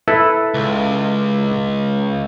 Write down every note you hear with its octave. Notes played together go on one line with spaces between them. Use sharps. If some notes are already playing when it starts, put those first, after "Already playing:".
E4 A4 B4
C#2